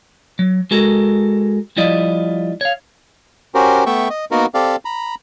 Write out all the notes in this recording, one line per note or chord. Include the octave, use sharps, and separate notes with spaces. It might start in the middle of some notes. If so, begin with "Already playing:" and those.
F#3
G#3 F#4 A4 A#4
F3 G3 E4 F4 D5 D#5
C#5 F5
C#4 F#4 G4 A#4 C5
A3 B3 E5 G5 C#6
D#5
A#3 B3 D#4 F#4 A#4
C4 G4 A4 D5 F5
A#5 B5